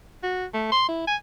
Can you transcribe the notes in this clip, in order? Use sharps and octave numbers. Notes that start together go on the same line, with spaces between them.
F#4
A3
C6
E4
G#5